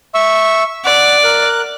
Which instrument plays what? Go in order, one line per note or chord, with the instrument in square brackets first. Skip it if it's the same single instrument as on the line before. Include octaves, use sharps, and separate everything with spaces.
[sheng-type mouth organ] E5 C#6 E6
[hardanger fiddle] D5 [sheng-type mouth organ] F#5
[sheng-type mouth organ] A#4 F#6